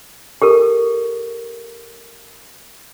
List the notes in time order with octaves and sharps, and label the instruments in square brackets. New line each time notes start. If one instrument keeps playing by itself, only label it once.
[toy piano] G4 A4 A#4